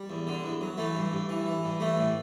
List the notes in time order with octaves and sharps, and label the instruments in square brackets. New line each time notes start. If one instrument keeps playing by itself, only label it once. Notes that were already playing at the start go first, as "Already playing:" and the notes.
Already playing: [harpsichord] G3
E2
D3
E2
F#3
E3 A3
G2
G2
E3
E3
G2
E3 A3
A2